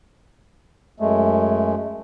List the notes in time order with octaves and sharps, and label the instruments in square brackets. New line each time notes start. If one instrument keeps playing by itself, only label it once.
[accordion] F#2 G#3 A3